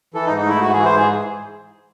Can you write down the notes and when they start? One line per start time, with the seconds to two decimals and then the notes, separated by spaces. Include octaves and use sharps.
0.14 E3 A4
0.26 D#4
0.30 G#2
0.38 D#4
0.46 A3 E4
0.61 G#2 F#4
0.73 E3 G#4
0.85 C5
0.92 G#2 G#4